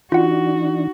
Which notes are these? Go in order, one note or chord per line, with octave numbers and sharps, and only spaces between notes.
E3 D4 D#4 F4 F#4 F#5